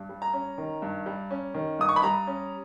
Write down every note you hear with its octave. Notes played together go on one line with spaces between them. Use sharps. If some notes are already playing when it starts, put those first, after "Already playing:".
Already playing: G2
G3
A#5
C#4
D#3
G2
G3
C#4
D#3
G2 D#6
C#6
B5
G3 A#5
C#4